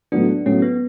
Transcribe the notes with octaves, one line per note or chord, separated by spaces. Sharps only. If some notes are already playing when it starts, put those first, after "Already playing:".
A2 F#3 B3 D4
A2 F#3 B3 C#4
B3